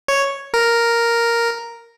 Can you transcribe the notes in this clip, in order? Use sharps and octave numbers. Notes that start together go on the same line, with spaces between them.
C#5
A#4